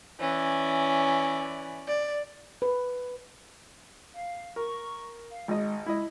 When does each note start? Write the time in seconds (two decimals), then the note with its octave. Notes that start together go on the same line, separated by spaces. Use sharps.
0.20 E3 C#4 D5
1.87 D5
2.62 B4
4.13 F5
4.56 A#4 C#6
5.31 F5
5.48 G#1 G#3 D#5
5.86 G#3 E4 D#5